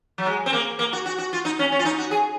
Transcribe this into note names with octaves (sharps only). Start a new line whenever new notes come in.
F#3
G#3
C4
A#3
A#3
F#4
F#4
F#4
F4
D#4
C#4
C#4
F4
D#4
F#4
G#4